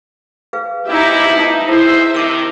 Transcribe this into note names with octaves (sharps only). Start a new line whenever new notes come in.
G#4 B4 F5
F3 B3 D#4 E4 G4 E5
D#4 E5 A5
E2 E4 G#4 A4 C5 E5
C3 D#3 D#4 D6 E6